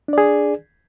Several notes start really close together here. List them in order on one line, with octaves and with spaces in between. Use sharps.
D4 D5 G#4